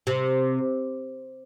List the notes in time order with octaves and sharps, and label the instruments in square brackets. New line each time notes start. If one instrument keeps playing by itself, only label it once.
[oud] C3